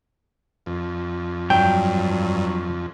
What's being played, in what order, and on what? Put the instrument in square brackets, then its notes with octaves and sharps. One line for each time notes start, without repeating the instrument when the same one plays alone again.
[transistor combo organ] F2
[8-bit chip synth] G2 [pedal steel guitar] F#3 [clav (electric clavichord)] G5